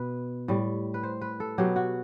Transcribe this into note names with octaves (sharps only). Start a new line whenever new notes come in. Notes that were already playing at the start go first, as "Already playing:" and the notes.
Already playing: B2 B4
A2 G3
B4
C5
B4
A4
B2 F#3 G4
F#4